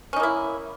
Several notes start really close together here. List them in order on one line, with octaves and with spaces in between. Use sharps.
C#4 D#4 A#3 E4